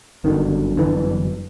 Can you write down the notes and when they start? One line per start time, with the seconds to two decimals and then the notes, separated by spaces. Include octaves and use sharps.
0.24 G1 F#2 D3 D#3
0.77 G1 F#2 D3 E3